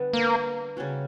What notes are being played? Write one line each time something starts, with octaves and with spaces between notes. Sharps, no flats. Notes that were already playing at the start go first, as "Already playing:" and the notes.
Already playing: D3 G3 B3
A#3
C#3 G3 C#4 F#4